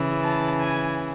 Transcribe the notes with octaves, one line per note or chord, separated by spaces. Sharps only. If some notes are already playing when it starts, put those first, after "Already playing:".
Already playing: C#3 E3
A5
G#5